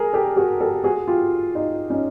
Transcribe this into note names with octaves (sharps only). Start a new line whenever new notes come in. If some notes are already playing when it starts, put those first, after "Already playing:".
Already playing: G#4 A#4
G4 A4
F#4 G#4
G4 A4
F#4 G#4
F4 G4
D#4 F4
C#4 D#4